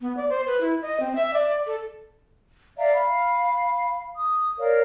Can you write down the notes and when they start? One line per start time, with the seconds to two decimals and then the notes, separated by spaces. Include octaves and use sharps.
0.01 B3
0.17 D5
0.29 C5
0.46 B4
0.61 E4
0.82 D#5
1.00 C4
1.15 E5
1.34 D5
1.67 A4
2.77 D5 E5 F5 A#5
2.93 F5 B5
4.15 D#6
4.59 A#4 C#5 D5 F5